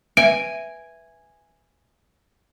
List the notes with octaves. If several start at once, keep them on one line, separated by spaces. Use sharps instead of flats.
B4 E5 G#5 D7